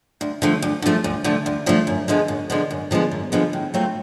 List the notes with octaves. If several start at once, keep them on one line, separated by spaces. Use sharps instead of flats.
D2
D3 F3 A3
D2
D3 F3 A3
D2
D3 F3 A3
D2
D3 F3 A3
F#2
D3 F3 G#3 B3
F#2
D3 F3 G#3 B3
F#2
D3 F3 G#3 B3
F#2
D3 F3 G#3 B3
A2
F#3 A3 C4 F4